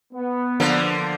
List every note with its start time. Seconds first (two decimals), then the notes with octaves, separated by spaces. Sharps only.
0.13 B3
0.60 D3 F3 A#3